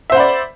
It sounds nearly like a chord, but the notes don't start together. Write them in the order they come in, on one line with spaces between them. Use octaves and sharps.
E5 C5 F#5 B5 D5